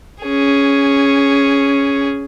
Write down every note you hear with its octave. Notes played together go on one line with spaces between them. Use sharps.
C#4 G#4